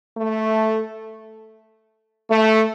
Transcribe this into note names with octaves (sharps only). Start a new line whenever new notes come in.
A3
A3